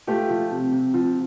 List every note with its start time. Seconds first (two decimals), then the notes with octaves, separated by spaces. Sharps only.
0.07 A3 F4 G4
0.30 F3
0.51 C3
0.72 C3
0.94 F3